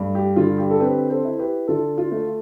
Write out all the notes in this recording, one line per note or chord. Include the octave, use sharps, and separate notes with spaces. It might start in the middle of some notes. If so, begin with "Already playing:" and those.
Already playing: G2 A3
G4
D3 F4
G4
A4
C4 G4 B4
A4 C5
E4
G4 B4
D3 F4 A4
F4
A3